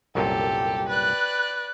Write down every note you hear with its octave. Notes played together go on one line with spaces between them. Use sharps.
C2 F#2 A#2 G4 A4
B4 D5 F#6